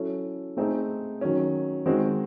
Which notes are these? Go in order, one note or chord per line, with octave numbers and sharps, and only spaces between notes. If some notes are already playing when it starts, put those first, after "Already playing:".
Already playing: F#3 C#4 E4 A4
A3 C4 D#4 G#4
D#3 F#3 C#4
D#3 G#3 C4 F#4